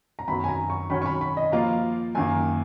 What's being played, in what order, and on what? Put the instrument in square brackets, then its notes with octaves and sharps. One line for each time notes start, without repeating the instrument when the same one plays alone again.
[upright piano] A#5
[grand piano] F#2 D#3 F#3 B3 [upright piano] B5
[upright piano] G#5
A#5
C#6
[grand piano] D#3 F#3 C#4 [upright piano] B5
[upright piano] C#6
B5
B5
D#5
[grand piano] F3 A#3 F4 [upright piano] A#5
[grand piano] F#2 D#3 A#3 [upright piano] G#5